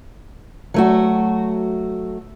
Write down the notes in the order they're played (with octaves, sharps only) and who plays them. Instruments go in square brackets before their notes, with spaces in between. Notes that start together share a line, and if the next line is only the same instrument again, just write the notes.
[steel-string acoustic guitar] F#3 A3 F#4